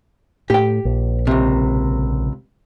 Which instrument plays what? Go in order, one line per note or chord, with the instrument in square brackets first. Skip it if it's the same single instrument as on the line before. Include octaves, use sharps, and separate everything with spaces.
[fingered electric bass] A2 [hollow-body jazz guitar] G4 G5
[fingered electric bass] A#1
[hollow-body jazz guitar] C#2 C3